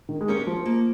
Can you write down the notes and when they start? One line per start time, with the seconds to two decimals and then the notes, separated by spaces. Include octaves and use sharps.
0.09 D#3
0.21 G#3
0.28 A#3 C#4 G4 A#4 C#5
0.47 F3
0.65 A#3